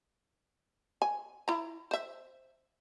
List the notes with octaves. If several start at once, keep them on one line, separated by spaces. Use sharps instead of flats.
G#5
E4 A#5
C5 E5